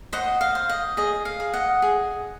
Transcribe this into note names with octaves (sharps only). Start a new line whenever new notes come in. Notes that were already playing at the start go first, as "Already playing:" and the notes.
C5 D#5 F#5
F5
C5
D#5
G#4 D#5
F5
G#4
D#5 F#5
G#4